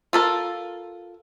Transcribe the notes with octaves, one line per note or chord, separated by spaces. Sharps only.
F4 A4 A#4